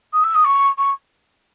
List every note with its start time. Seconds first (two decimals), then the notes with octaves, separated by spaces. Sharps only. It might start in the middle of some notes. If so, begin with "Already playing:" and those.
0.13 D#6
0.24 E6
0.34 D#6
0.44 C#6
0.78 C#6